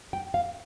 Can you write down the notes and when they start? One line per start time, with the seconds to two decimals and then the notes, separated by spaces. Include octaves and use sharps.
0.13 G5
0.34 F5